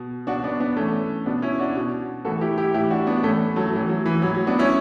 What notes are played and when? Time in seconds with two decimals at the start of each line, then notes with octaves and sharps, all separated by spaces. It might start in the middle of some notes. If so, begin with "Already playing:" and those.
Already playing: B2
0.27 B2 D4 F#4
0.44 B3 D4
0.60 B3 D4
0.76 A2 E3 A3 C#4
1.26 B2 B3 D4
1.42 C#4 E4
1.59 D4 F#4
1.76 B2
2.25 A2 E3 F#4 A4
2.41 E4 G4
2.58 E4 G4
2.74 A2 E3 E4 G4
2.90 D4 F#4
3.07 B3 D4
3.23 A2 E3 A3 C#4
3.56 F#3 A3
3.73 A2 F#3
3.76 E3
3.89 F#3
4.06 E3
4.22 A2 E3 F#3
4.35 F#3
4.47 B3 D4
4.59 C#4 E4